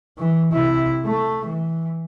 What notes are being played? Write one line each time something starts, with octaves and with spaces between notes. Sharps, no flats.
E3
C3 E4
A3
E3